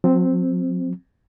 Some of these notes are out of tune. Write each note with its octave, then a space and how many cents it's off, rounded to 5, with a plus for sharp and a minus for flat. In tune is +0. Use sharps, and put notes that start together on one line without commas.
F#3 -45 C4 +0